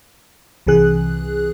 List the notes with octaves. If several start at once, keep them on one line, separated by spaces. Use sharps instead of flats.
C2 C3 E3 G#4 F#6